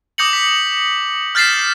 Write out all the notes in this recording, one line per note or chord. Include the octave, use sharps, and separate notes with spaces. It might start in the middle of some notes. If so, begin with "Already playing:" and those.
D6 D#6 G6 A#6 C#7 F#7
B6
F6 G6 A6 B6 C7 E7